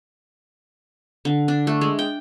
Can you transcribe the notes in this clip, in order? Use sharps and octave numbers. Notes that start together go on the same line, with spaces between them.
D3
D4
A3
G#3
G5